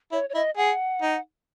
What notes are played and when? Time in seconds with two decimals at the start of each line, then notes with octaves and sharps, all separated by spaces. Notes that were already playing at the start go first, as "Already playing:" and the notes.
0.12 E4 C#5
0.30 C#5
0.35 E4 D#5
0.57 G#4 F#5
1.02 D#4